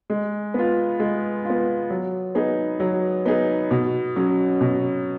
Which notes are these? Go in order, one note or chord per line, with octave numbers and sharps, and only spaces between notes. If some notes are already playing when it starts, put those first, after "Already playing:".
G#3
B3 F4
G#3
B3 F4
F#3
B3 D#4 G#4
F#3
B3 D#4 G#4
B2
F#3 C#4
B2